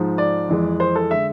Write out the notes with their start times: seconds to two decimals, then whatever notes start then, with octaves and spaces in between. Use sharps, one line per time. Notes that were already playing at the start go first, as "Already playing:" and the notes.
Already playing: G#2 F3 G#3
0.18 D5
0.49 F2 E3 G#3
0.80 C5
0.96 A4
1.11 D3 G#3 E5